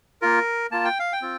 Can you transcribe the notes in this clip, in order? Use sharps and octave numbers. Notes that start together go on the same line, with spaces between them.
A#3 F4 A#4
A#3 F4 A5
G5
F5
G5
C4 F4